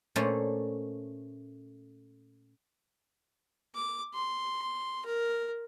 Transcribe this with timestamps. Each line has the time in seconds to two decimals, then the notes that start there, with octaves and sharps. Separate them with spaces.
0.16 A#2 A3 C#4 C5 D5
3.75 D6
4.14 C6
5.06 A#4